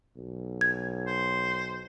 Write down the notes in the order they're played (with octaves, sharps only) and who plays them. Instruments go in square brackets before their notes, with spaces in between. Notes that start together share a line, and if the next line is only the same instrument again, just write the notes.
[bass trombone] B1
[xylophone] G#6
[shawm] C5